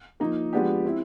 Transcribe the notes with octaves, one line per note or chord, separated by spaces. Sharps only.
F3 A#3 D#4
F3 G#3 B3 D4 G4
C4 E4